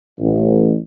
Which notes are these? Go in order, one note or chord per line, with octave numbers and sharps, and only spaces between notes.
A1